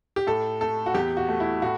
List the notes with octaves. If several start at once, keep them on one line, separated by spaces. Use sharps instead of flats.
G4
A2 A4
A3 A4
F#4
E2 G4
F#4
A3
E4
A2 F#4